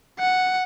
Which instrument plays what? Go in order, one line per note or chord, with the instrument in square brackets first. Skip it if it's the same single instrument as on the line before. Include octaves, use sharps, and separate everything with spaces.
[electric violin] F#5